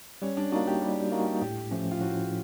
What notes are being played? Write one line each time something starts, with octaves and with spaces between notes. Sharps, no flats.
G3 C#4
D4
A#3 D4 D#4 F#4
G4
G3
A#3 D#4 F#4
A2 G4
F3 A3 C#4
F4
A2 F#4